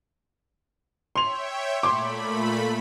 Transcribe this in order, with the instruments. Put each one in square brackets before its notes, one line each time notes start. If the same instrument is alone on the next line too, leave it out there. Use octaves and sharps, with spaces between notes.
[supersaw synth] C#5 E5 G5 [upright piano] C6 F7
[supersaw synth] A#2 A3 B5 [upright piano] C6 D6